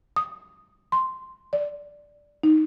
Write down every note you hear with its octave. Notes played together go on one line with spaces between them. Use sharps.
D#6
C6
D5
D#4